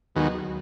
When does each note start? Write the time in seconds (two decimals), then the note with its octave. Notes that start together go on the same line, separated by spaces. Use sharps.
0.16 D#2 D#3 F#3 G#3 B3 F#4